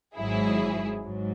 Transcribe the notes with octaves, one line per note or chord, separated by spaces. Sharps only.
G#1 G#2 F#3 E4 G#4
G#2 F#3